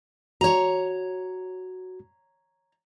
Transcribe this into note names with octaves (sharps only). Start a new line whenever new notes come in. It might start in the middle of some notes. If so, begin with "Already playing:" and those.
F#4 C#5 A#5